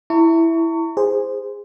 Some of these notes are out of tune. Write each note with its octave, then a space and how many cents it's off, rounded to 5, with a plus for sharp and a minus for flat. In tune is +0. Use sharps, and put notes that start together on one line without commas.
E4 +0 A#5 -45 C#6 +20
G#4 -20 C5 -10